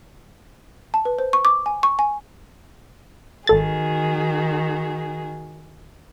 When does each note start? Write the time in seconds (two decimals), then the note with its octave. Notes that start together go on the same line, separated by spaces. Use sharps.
0.94 A5
1.05 B4
1.19 C5
1.33 C#6
1.45 D6
1.66 G#5
1.83 C#6
1.99 G#5
3.47 G#1 D#3 F#4 G#4 A4 A6